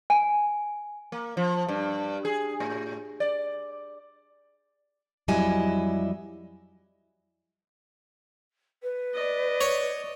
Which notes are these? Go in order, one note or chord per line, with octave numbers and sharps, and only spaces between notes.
G#5
A#3
F3
G2
G#4
A2
D5
F2 F#3 G3 E4 D#5 G#5
B4
D5 D#5
C#5